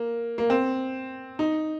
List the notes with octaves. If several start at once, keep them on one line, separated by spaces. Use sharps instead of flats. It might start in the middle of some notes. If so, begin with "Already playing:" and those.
Already playing: A#3
A#3
C4
D#4